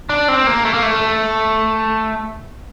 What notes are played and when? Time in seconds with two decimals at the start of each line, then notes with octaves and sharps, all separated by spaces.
0.09 D4
0.28 C4
0.47 A#3
0.65 A3
0.74 A#3
0.83 A3